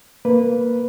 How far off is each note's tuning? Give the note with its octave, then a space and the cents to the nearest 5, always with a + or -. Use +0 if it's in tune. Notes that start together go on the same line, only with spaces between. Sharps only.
A#3 +0 B4 +0